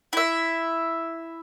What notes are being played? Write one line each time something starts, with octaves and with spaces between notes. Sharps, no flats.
E4 E5